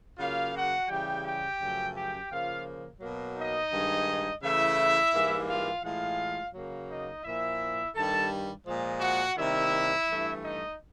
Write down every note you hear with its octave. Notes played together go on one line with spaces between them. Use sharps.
C#3 F#3 A#3 F4 F5
F#4 F#5
C#3 E3 G3 G4 G5
G4 G5
F#2 C#3 F3 A3
G4 G5
C#3 F3 A#3 F4 F5
B2 F#3 A#3
D#4 D#5
G2 D#3 G#3
C#3 E3 A3 E4 E5
G#2 E3 G3 A#3
F4 F5
A2 E3 G#3 F4 F5
C#3 F#3 A#3
D#4 D#5
A#2 F3 A#3 E4 E5
G2 D#3 G3 A4 A5
A#2 F3 G#3
F#4 F#5
C3 D#3 G3 A#3 E4 E5
G2 E3 A3
D#4 D#5